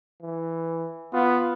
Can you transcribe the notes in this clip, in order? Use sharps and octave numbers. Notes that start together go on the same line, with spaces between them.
E3
B3 F4